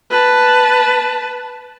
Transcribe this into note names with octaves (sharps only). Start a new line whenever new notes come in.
B4 A5